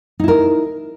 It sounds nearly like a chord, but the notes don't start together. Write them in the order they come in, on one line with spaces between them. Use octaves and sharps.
D#4 E4 A#4